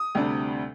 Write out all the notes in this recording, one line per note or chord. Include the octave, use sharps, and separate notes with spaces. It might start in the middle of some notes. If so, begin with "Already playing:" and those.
Already playing: D#6
D2 C3 G3 D4